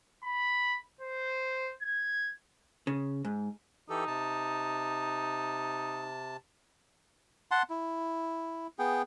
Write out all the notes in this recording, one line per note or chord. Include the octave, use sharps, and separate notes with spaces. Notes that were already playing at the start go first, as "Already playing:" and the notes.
B5
C5
G#6
C#3
G#2
E3 D#4 G4 A4
C3 A5
F#5 A5 C6
E4
B3 G#4 G5